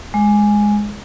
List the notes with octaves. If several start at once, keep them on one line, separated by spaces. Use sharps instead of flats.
G#3